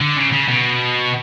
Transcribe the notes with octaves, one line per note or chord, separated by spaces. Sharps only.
D3
C#3
C#3
B2